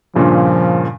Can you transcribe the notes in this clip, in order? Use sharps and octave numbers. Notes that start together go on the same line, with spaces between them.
G2 A#2 C#3 F3